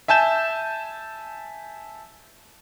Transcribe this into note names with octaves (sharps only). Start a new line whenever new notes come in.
E5 G#5 A5 G6 E7